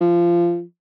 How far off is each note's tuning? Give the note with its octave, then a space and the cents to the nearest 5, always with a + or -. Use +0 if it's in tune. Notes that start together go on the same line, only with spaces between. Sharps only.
F3 -20